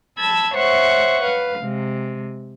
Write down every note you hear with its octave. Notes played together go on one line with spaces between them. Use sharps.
A5 B5 E6 G#6
C5 C#5 E5 F#5 C#6
B4 F5
C3 G#3